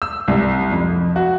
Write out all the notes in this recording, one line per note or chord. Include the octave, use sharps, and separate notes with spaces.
E6
C2
F2
F#4